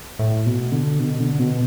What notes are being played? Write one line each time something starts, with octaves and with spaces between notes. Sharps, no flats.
A2
B2
D3
B2
D3
B2